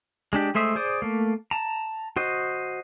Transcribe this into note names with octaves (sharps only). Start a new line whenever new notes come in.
G#3 D4 G4
G#3 A3 C5 E5 D#6
G#4 C5 D5 D#6
A3 A#3
A5 A#5
F#4 C5 D#5